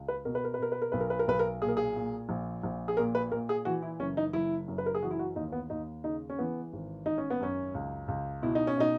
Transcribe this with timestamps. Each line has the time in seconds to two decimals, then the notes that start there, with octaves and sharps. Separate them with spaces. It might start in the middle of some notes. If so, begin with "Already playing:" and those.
Already playing: C#2
0.08 B4
0.25 B2 A#4
0.35 B4
0.44 A#4
0.54 B4
0.59 B2 A#4
0.72 B4
0.82 A#4
0.92 B1 B4
1.00 A#4
1.10 B4
1.19 A#4
1.27 B1 B4
1.39 A#4
1.61 A#2 G#4
1.68 A#4
1.77 G#4
1.96 A#2
2.29 A#1
2.63 A#1
2.88 G#4
2.97 A#2 A#4
3.15 B4
3.31 A#2 A#4
3.49 G#4
3.65 E3 F#4
3.82 E4
4.00 F#1 C#4
4.17 D#4
4.33 F#1 E4
4.68 F#2
4.78 B4
4.86 A#4
4.95 G#4
5.03 E3 F#4
5.11 E4
5.19 F#4
5.36 D#2 D#4
5.52 B3
5.70 D#2 D#4
6.04 C#3 D#4
6.30 C#4
6.39 E3 B3
6.73 G#1
7.06 G#1 D#4
7.18 C#4
7.30 B3
7.40 F#2 C#4
7.74 C#2
8.08 C#2
8.42 B2 E4
8.55 D#4
8.67 C#4
8.77 B2 D#4